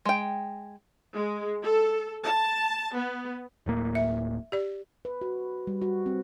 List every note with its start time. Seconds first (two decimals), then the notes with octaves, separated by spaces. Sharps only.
0.05 G#3 G5
1.14 G#3
1.61 A4
2.24 A5
2.93 B3
3.66 D1 A2 A#3
3.95 E5
4.52 G4 D5
5.05 B4
5.21 F#4
5.67 G3
5.82 F#4
6.06 C4